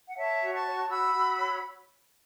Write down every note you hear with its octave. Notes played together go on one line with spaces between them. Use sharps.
F#5
C#5 E5 A5
F#4
A5 C#6
C#5
F#4 B5 E6
F#4
C#5